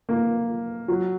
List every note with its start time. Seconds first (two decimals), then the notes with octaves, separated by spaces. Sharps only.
0.09 A#3
0.88 F#3